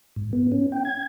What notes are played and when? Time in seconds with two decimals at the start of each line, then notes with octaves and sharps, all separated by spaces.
0.16 G#2
0.33 B3
0.52 C#4
0.72 G5
0.85 G#6